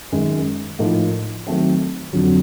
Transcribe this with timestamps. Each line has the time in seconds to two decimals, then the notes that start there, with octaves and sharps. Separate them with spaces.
0.12 F#2 D#3 G#3
0.79 A2 F3 A#3 D#4
1.47 D#3 F#3 A3 C4
2.13 F2 D3 F#3